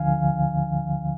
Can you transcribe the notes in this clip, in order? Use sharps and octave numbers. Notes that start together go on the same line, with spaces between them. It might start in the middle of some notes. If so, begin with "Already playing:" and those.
Already playing: D2 D3 F3 F5 G#5